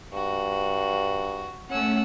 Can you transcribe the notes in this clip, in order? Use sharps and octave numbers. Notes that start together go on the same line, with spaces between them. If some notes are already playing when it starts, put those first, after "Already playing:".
G2 F#4
A3 C#4 F#5 E6